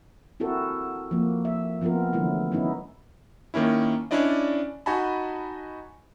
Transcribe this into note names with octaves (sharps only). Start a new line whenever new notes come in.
C4 E4 F#4 A4 A#4
F3 A#3
E5
F3 B3 C4 F4 A#4
D3 E3 F#3 A3 E4
B3 C#4 D#4 E4
D#3 A#3 C#4 E4
C#4 D4 E4 D5 D#5
D#4 F#4 D#5 G#5 A5 B5